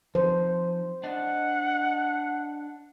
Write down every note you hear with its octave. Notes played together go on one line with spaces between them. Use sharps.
F3 D#4 C5
D4 D5 D#5 F#5